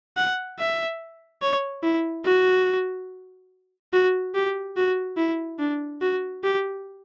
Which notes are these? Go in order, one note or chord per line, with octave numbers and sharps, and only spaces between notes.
F#5
E5
C#5
E4
F#4
F#4
G4
F#4
E4
D4
F#4
G4